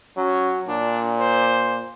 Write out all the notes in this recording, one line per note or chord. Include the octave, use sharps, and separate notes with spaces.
F#3 C#4
A#2 D4
C5